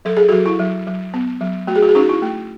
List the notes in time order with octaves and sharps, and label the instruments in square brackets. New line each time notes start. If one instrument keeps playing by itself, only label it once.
[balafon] F#3 A4
G#4
F#4 A4
F#3
E4
F#3
F#3
B3
F#3
A3 F#4
G#4
F#4
G#4
C#4 D#4 F#4
E4
A3